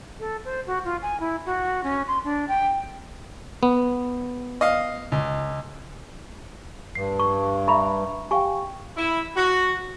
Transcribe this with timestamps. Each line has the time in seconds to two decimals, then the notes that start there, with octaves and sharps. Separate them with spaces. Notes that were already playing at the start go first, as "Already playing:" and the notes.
0.20 A4
0.45 C5
0.67 F#4
0.85 F4
1.02 G#5
1.20 E4
1.46 F#4
1.84 C#4
2.08 C6
2.24 D4
2.48 G5
3.63 B3
4.61 D#5 F5
5.12 C#2
6.95 G2 C7
7.19 C#6
7.68 E5 A#5 B5 C#6
8.31 G4 F5 G5 G#5 C#6
8.97 E4
9.37 F#4